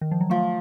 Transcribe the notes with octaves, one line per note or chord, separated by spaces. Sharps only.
D#3
F3
F#3
F3 A3